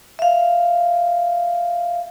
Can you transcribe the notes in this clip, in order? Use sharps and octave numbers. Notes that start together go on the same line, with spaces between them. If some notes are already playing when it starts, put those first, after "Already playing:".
E5 F5